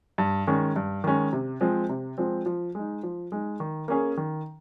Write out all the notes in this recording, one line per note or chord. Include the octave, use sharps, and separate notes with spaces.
G2
D#3 G#3 C#4
G2
D#3 G#3 C#4
C3
F3 G#3 C4
C3
F3 G#3 C4
F3
G#3 D#4
F3
G#3 D#4
D#3
A#3 C#4 G#4
D#3